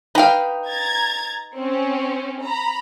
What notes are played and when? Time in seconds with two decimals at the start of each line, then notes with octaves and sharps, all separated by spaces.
0.15 D#4 B4 F5 G5
0.67 A#5 G#6 A6
1.55 C4 C#4
2.43 A#5 B5